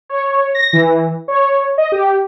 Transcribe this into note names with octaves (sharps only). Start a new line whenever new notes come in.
C#5
A#6
E3
C#5
D#5
G4